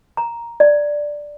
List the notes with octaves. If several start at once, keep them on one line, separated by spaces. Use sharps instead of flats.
A#5
D5